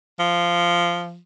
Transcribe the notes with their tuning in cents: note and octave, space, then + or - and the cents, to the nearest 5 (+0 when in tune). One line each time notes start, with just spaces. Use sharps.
F3 -10